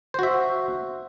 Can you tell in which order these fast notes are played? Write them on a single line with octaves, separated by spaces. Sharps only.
C5 F#4 E5